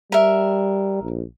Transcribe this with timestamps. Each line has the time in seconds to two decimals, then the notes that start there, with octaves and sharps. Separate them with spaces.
0.12 G3 A#4 E5
1.03 A#1